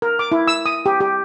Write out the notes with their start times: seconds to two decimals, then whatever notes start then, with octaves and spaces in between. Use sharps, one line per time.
0.02 A#4
0.19 D6
0.32 E4
0.48 E6
0.66 D#6
0.86 G4
1.00 G4